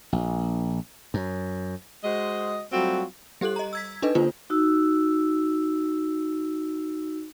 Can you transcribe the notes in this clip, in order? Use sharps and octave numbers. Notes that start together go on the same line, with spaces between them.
A#1
F#2
G#3 F#4 C5 D#5
F#3 G3 A3 C4 F4 F#4
G3 G4 A4 F#6 F#7
D#5 A#5
E6 G#6 B6
D4 D#4 A4 B4 D#5
D3 A#3 D4 F4 C5
D#4 F#4 E6